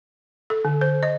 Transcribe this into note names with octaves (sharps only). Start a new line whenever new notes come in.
A4
D3
C5
D#5